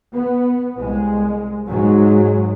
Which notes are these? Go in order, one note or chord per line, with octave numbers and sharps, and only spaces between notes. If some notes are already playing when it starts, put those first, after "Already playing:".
B3
C2 G#3
G#2 F#3 G#3